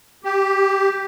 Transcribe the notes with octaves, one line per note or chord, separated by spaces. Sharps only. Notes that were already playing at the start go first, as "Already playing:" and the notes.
G4